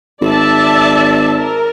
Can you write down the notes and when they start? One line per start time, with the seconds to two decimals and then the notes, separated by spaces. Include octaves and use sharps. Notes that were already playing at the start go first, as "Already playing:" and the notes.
0.21 G#1 D5 E5 A5
1.36 A#4